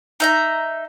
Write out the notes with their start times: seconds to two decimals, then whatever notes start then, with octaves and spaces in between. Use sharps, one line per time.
0.20 D#4 E5 A#5